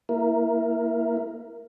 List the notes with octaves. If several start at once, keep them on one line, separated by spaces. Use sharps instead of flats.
A#3 E4 A#4